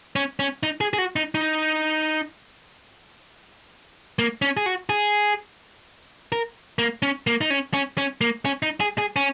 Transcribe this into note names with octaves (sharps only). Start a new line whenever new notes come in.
C#4
C#4
D#4
G#4
G#4
F#4
D#4
D#4
A#3
C#4
G#4
F#4
G#4
A#4
A#3
C#4
A#3
D#4
C#4
C#4
C#4
A#3
C#4
D#4
G#4
G#4
C#4